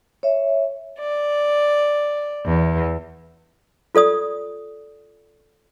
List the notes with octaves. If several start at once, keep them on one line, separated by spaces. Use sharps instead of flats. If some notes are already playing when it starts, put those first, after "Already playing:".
C#5 E5
D5
E2
F4 A4 D5 D#6